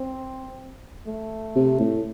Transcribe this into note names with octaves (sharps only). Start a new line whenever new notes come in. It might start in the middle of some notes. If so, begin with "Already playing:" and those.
Already playing: C4
A3
C3
A2